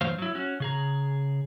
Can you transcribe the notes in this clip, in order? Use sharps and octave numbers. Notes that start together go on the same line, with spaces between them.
G2 E3 F#3 A3 C5 F5
F#3 E4
C#4 F#4
C#3 G#4 A#5